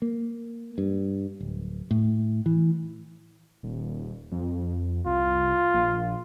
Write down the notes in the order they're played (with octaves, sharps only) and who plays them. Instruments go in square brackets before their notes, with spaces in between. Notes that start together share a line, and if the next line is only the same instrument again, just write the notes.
[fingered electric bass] A#3
G2
D1
A2
E3
[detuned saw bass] D#1
F2
[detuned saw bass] C2 [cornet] F4
[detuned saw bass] A#1